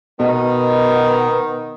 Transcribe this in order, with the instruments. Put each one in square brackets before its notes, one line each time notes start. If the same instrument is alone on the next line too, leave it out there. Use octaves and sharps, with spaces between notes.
[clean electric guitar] B2 [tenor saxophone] D#3 [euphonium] B3